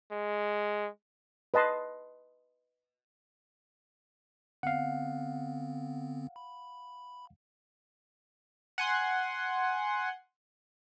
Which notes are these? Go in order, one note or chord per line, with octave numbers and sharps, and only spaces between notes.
G#3
B4 D#5 A5 C6
D3 B3 C4 F5 F#5
B5
F#5 G#5 C6